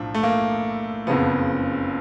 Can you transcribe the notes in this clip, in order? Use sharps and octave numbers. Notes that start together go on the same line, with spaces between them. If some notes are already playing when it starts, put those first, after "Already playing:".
Already playing: B1 A2 F3 D4
A3
A#3
F#1 F2 C#3 F3 B3